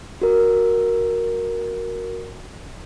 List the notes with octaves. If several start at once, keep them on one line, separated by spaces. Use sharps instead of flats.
F#4 A#4